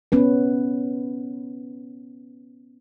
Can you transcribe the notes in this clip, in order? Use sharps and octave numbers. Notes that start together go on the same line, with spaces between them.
B3 C#4 B4